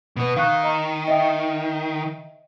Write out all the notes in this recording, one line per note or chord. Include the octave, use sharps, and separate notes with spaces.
B2 B3
D#3 F5 C#6 F#6
D#5 A#5
D#5 E5 G5